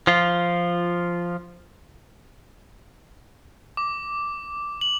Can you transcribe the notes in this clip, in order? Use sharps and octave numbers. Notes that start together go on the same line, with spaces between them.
F3 F4
D6
F#7